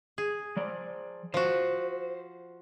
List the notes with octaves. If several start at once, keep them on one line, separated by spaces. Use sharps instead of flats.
G#4
F3 D5
F3 F#4 C5